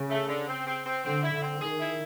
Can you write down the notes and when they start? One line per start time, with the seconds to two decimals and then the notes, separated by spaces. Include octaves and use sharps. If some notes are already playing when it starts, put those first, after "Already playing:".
Already playing: C#3
0.10 A3
0.29 D3
0.48 C4
0.67 C4
0.86 C4
1.05 D3 C4
1.23 E4
1.33 D3
1.42 C4
1.61 D#3 G#4
1.80 E4